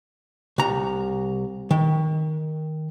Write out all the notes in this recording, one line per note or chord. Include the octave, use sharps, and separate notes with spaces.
C2 A#5
D#3